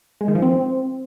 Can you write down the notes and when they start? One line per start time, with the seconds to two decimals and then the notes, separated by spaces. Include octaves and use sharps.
0.21 G#3
0.28 D#3
0.35 F3
0.42 C4